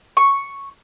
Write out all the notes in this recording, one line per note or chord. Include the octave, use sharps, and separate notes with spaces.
C#6